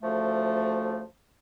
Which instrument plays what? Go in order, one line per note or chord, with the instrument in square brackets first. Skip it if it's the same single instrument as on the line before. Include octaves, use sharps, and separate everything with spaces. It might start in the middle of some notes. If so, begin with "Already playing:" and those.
[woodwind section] D2 C#3 F3 A3